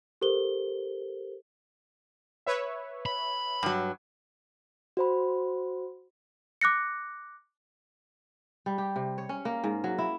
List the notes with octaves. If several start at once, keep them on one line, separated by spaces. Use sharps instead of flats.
G4 A4 A#4 C5 G7
B4 C#5 E5
B5
G2 F#3
F#4 C5 B5
D6 F#6 A#6 C#7
G3
G4
C3
C#5
C#4
A#3
G#2
F#3
E4